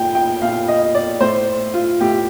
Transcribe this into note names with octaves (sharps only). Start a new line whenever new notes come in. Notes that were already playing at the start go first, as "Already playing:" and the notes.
Already playing: A#2 G5
G5
A#2 F5
D#5
D5
A2 C5
F4
A2 G4